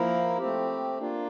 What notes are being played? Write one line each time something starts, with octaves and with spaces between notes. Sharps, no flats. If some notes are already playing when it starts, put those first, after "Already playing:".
Already playing: F3 A#3 E4 A#4
A3 C4 G4
A#3 D4 F4